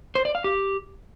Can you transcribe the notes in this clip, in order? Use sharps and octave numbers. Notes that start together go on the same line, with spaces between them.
C5
D5
F5
G4